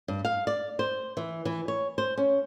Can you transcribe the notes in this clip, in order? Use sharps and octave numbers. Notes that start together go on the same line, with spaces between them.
G2
F5
D5
C5
E3
E3
C#5
C5
C#4